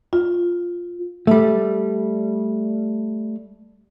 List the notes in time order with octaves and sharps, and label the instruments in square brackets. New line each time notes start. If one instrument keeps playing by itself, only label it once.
[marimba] F4
[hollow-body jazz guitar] G3 A3